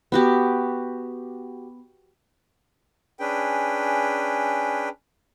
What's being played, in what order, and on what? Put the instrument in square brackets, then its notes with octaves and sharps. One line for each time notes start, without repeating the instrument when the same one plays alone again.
[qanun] B3 F#4 G4
[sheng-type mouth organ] C#4 D4 G#4 B4 G5